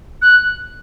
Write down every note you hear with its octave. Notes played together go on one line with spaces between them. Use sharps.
F#6